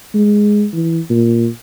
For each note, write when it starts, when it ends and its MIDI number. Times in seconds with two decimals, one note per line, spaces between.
0.14 0.66 56
0.73 1.00 52
1.10 1.47 46